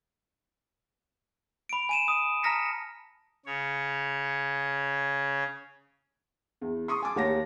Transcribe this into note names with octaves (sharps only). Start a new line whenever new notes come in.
B5 D7
G#5 D#7 E7
D#6
A5 A#5 F6 A#6 B6 C#7
C#3 C#5
E2
C6 C#6 D#6
G#5 A5 D6
D#2 A#3 G4 C#5 A5 A#6